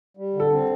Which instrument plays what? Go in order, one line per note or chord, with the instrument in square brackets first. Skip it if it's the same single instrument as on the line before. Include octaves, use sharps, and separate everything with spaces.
[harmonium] G3
D3
[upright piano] A4
[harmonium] C4